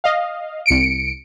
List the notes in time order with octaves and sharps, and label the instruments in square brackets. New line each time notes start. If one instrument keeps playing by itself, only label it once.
[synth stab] D#5 F5
C2 C#7 D7